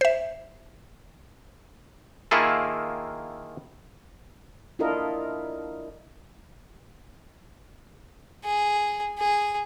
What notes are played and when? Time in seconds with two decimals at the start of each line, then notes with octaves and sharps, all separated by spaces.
0.01 C5 E5
2.31 D#3 A#3 E4 F4 G#4 A4
4.79 D4 E4 F4 A4 A#4 D#5
8.44 G#4
9.18 G#4